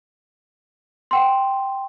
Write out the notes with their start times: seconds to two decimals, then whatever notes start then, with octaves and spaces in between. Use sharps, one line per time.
1.11 F#5 G5 C6